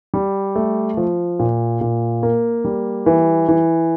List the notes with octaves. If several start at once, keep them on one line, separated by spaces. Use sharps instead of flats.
G3
A3
F3
A#2
A#2
A#3
G3
E3
E3